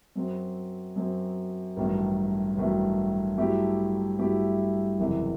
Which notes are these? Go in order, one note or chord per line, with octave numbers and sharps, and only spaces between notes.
F#2 F#3 C4
F#2 F#3 C4
A1 G2 D#3 F#3 A3
A1 G2 D#3 F#3 A3
G2 F#3 A3 E4 G4
G2 F#3 A3 E4 G4
F#1 E2 C3 E3